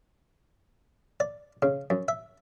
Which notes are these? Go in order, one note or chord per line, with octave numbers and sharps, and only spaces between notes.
D5
C#3
F#2
E5